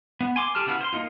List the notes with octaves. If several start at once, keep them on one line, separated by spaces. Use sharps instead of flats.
B3
G#5 C6 D6
G4 G#4 A5 F6
C#3 B3 E4 F#4 F6
C5 C6
A#3 D4 D#4 F4